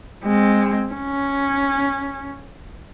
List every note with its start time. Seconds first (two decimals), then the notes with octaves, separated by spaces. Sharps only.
0.24 G#3 C4
0.94 C#4